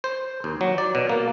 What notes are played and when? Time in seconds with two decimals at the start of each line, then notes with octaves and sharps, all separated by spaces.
0.04 C5
0.44 D#2
0.61 F#3
0.78 D5
0.95 B2
1.09 A#3